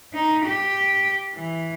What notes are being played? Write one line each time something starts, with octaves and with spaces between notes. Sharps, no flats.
D#4
G4
E3